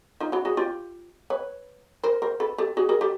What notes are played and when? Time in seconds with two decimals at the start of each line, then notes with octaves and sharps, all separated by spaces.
0.20 D#4 F4
0.32 E4 F#4
0.45 F#4 G#4
0.57 F4 G4
1.30 B4 C#5
2.03 A#4 C5
2.22 A#4 C5
2.40 A4 B4
2.58 G4 A4
2.77 F#4 G#4
2.89 G#4 A#4
3.01 G4 A4